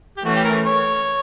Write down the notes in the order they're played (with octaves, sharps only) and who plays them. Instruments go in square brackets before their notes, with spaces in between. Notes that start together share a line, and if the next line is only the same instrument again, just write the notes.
[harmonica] G4
[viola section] E3 A3 C#4 [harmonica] F#4
[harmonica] G4
A#4
C#5